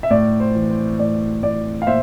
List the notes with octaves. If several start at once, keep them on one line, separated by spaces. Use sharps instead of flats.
E5
A2 D5
C5
E3
C5
A2 D5
A2 D5
F5
A#2 C5 E5